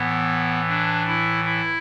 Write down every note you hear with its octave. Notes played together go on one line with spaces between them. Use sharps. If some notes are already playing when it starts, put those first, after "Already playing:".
Already playing: A2 E3 B3
D4
E4
E4